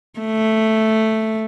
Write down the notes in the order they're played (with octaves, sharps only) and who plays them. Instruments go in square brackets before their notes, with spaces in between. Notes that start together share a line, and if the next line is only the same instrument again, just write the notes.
[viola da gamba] A3